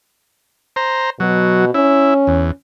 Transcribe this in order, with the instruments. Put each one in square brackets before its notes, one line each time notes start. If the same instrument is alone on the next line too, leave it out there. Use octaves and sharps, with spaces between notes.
[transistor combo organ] C5 A#5
[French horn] B2 [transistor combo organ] F#3
[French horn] C#4 [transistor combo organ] E4
[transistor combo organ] E2